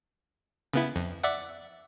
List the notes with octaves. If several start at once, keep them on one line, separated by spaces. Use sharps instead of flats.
C#3 B3 E4
F2
D5 E5 F#5